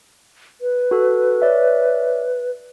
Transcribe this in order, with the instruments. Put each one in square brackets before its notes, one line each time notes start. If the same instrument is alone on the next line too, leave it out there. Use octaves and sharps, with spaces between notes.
[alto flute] B4
[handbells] F#4 A4
C#5 D5 E5